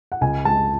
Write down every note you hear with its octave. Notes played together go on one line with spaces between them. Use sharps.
F#5
C#2 G#5
G#3 A5